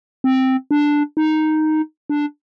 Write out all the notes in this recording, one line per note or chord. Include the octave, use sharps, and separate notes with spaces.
C4
D4
D#4
D4